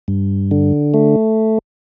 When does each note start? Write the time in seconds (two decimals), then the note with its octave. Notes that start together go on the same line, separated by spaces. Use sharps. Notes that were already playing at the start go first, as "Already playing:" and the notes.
0.08 G2
0.51 D3
0.94 A3